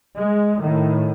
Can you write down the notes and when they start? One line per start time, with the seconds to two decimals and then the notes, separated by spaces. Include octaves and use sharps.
0.17 G#3
0.60 A2 D#3